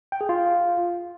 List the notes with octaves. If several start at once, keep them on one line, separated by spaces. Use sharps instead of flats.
G5
G#4
F4